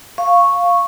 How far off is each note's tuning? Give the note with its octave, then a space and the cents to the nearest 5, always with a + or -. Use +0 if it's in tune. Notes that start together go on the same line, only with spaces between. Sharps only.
F5 +0 C#6 -5